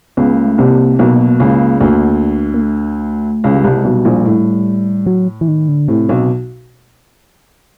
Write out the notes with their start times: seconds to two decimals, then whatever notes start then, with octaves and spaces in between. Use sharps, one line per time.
0.17 C#2 C#3 B3
0.32 A#3
0.45 A3
0.58 C2 C3 A#3
0.99 B1 B2 A#3
1.40 C#2 C#3
1.80 D2 D3 A#3
2.54 A#3
2.62 A3
3.44 C#2 C#3 G#3
3.55 G3
3.63 C2 C3 G#3
3.77 G#3
3.84 B1 B2 G3
4.05 A#1 A#2
4.25 A2
5.06 F#3
5.41 E3
5.48 D#3
5.68 D3
5.88 A2 C3
6.09 B1 B2